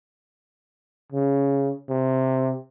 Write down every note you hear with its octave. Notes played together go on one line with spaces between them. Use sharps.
C#3
C3